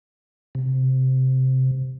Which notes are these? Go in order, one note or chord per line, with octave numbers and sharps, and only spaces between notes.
C3